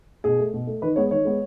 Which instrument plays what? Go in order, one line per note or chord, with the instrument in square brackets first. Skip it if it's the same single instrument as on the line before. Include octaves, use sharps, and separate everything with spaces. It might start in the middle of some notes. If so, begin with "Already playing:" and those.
[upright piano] B2 G#4
A3
B2
A3
D#3 B4
G#3 B3 C#5
D#3 C#5
G#3 B3